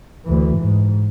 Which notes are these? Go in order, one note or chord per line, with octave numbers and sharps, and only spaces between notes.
D2 E3
G#2